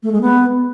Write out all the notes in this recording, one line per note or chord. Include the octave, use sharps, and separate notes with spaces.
A3
G#3
B3